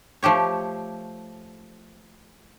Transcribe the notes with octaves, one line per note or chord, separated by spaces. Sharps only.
F3 A3 G4 C#5